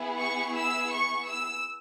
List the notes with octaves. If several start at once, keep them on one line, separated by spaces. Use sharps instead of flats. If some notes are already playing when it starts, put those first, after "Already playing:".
Already playing: B3 E4 G#4
C#6
E6
C#6
E6